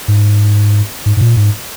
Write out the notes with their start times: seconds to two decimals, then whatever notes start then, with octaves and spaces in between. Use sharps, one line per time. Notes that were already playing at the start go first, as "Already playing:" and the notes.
0.08 G#2
1.06 G#2
1.17 G#2
1.21 A#2
1.36 G#2